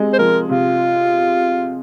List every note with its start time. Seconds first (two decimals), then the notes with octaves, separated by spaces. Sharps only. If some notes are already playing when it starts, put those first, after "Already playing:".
Already playing: C3 G#3
0.13 C5
0.18 F3 A#4
0.49 C3 F4